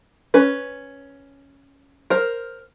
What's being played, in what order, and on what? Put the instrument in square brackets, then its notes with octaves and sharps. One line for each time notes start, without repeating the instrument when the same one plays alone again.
[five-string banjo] C#4 B4
A#4 C5